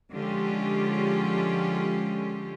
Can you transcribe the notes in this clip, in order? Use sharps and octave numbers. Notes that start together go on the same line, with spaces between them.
D3 F3 G#3 C#4 F4 G4